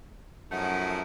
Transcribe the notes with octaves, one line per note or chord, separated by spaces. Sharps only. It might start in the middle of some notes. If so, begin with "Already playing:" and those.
F#2 F3 A3 D#4 E4 F#5